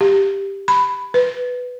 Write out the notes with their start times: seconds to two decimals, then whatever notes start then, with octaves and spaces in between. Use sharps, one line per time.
0.01 G4
0.68 B5
1.14 B4